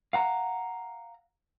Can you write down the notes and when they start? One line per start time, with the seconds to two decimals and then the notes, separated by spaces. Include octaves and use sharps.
0.13 F5 F#5 A#5